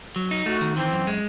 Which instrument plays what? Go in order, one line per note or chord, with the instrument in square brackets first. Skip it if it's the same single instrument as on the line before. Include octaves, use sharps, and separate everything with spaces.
[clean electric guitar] F#3
D#4
[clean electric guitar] A3 [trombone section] F#4
[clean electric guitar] D#3
[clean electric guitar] E3 [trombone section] C4
[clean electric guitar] F#2
G#3